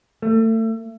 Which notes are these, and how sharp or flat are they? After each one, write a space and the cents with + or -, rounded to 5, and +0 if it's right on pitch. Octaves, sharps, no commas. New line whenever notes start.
A3 +30